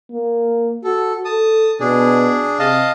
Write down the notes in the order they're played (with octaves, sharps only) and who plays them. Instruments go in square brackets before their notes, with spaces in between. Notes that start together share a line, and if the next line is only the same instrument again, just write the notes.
[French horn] A#3
[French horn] F#4 [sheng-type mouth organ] A4
[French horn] A4 [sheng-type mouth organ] A5 D#6
[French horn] B2 [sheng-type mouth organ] D4 G#4
[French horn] C3 [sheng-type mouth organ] D#5 F5 A5